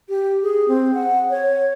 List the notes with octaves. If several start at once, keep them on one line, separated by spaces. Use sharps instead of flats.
G4
G#4
C4
F#5
C#5